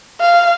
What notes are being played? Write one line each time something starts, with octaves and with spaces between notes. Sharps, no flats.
F5